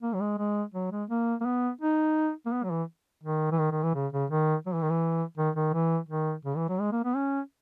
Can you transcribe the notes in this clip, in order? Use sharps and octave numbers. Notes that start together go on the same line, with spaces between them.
A#3
F#3
G#3
G#3
F#3
G#3
A#3
A#3
B3
D#4
A#3
B3
F#3
E3
D#3
E3
D#3
D#3
E3
C#3
C#3
D#3
F#3
E3
D#3
E3
D#3
D#3
E3
D#3
C#3
E3
F#3
G#3
A#3
B3
C#4